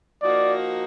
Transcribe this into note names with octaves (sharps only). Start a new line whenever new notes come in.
F3 A#3 D#4 F#4 A#4 D5